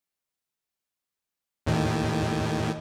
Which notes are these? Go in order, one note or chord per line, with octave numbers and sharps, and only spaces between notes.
D#2 A2 D#3